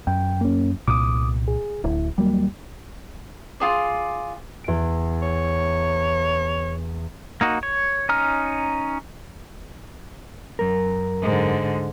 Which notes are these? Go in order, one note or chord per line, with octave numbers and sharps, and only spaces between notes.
F#2 G5
A#3 C#4
C2 A#2 D6 D#6
G#4
D1 E4
D#2 F#3 G3 A#3
F4 G#4 D5
E2 D7
C#5
A#3 D#4 F#4
C#5
C#4 D#4 A#5 F6
F#2 A#4
G#2 D3